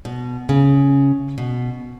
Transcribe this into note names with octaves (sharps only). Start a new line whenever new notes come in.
B2
C#3
B2